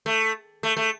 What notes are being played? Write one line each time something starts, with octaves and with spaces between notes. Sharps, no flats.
A3
A3
A3